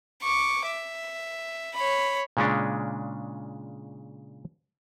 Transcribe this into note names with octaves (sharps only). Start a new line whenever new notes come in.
C#6 D6
E5
C#5 B5
A#2 C#3 G#3 C#4 D4